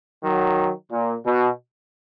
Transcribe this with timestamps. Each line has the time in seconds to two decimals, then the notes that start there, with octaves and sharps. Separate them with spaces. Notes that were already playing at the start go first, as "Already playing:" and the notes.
0.23 D#3 F#3
0.91 A#2
1.25 B2